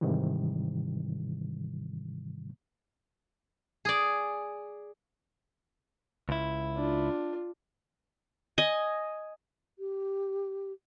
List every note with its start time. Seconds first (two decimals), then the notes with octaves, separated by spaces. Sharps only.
0.01 G#2 C3 D#3 E3 G3
3.85 G#4 D5
6.29 C#2 E4
6.77 D4 F4
8.58 D#5 G#5
9.79 G4